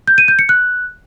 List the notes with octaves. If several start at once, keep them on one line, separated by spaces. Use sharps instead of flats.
G6
D#7
G6
C#7
F#6